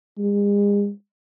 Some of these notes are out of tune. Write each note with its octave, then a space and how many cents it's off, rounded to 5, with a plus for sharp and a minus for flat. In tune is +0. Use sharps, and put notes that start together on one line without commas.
G#3 -40